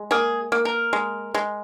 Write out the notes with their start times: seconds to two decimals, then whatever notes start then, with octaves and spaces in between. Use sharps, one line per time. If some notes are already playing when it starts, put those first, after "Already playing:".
Already playing: G#3
0.11 A#3 G#4
0.52 A#3
0.65 A#4
0.93 G#3
1.34 G#3